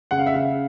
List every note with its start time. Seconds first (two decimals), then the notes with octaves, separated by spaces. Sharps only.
0.11 C#3 F#5
0.19 F5
0.26 E5
0.34 C#3 F5